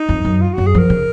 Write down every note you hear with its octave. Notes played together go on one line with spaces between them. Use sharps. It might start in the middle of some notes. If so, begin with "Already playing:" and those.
Already playing: D#4
F2
F#2
F4
F#2 F#4
G#4
F3 A#4
C#3